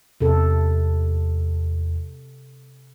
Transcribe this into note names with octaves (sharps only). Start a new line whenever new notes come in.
E2 C3 A4